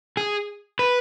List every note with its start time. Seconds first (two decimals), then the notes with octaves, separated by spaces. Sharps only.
0.17 G#4
0.79 B4